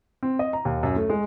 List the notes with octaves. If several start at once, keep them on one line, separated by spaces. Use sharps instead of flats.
C4
D#5
A#5
D#2
F#2
A3
G#3